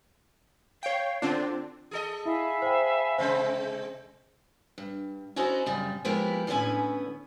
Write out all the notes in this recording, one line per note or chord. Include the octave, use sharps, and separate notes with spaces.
C#5 F5 G5
D3 C4 D4 F4
G#4 A4 D#5
E4 E5 F5 G#5 B5
C5 G5
C3 G#3 C4 C5
G2
C#4 E4 F#4 A4 C5 D#5
F#2 C#3 G3
F3 G#3 A#3 B3 E4 G4
A2 D3 B3 C#4 E4 G#5